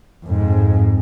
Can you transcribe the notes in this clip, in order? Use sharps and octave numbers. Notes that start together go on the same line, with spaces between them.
F2 G#2